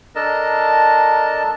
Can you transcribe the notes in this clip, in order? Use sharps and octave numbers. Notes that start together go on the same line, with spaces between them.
D4 A4 A#4 D#5 A5